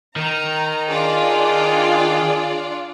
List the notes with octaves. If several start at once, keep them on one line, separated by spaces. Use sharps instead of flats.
D#3 A#5
D4 F4 G#4 D5